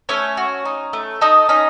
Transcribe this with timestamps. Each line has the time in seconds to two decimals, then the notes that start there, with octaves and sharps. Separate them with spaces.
0.09 A3 C#4 C#5
0.37 F#4
0.65 D#4
0.93 A3
1.21 D#4 A4 D#5
1.49 C#4 D#4 D#5